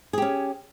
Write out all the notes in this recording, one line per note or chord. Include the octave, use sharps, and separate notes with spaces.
C#4 G4 G#4